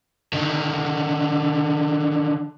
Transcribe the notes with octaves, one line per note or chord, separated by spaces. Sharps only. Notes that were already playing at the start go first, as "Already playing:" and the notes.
D3 D#3